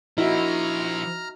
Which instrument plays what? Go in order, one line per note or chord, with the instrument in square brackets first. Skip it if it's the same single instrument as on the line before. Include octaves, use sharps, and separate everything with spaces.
[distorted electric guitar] F3 A#4 [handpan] D#4 F#4 E5 [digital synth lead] E4 [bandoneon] A#5 F6